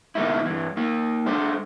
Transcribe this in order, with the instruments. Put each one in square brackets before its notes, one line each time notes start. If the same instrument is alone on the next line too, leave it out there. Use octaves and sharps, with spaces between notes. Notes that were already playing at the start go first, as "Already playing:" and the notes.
[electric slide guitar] B2 D#3 G3 A#3 D#4 E4
G2 E3
A#3 D#4
G3 A3 D4 C5